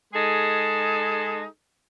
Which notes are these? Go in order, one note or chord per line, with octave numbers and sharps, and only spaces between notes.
G#3 D#4 G#4 A4